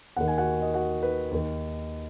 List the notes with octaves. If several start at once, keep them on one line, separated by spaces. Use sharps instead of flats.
D#2 D#3 F#5
G#5
F#4 F#5
D#5
F#4 F#5
B4
D#2 D#3